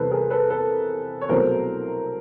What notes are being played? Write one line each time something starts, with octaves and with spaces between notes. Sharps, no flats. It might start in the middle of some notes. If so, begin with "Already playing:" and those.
Already playing: E2 C3 E3 G3 A4 B4 C5
G#4 A#4
A4 B4
A4 B4
C#5
C2 B2 F#3 A3 C4 A#4 C5